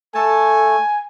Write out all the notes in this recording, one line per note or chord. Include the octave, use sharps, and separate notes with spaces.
A3 A4 G#5